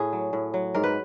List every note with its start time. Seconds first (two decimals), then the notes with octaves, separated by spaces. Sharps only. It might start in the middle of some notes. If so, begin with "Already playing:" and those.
Already playing: A2 G#4
0.13 F#3
0.33 A2
0.54 F#3
0.74 G#2 A#4
0.84 B4